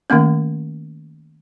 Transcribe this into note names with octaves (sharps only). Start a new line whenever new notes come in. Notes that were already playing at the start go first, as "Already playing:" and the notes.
D#3 A3 A#3 C#4